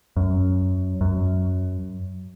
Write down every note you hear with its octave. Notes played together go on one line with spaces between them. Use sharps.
F#2
F#2